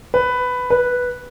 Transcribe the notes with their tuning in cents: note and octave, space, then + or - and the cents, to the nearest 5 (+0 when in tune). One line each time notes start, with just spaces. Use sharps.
B4 +10
B4 -5